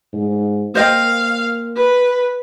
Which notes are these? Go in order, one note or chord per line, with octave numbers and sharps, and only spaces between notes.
G#2
A#3 C5 D#5 F5 G5
B4